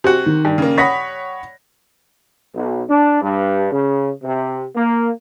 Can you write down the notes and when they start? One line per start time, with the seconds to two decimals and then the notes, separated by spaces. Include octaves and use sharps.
0.04 C3 F#4
0.26 D#3
0.45 G2
0.58 C#3 A#3
0.78 C#5 F#5 B5 D#6 A#6 B6
2.54 B1
2.88 D4
3.21 G2
3.71 C#3
4.22 C3
4.75 A#3